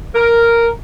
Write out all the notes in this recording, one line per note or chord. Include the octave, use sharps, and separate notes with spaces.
A#4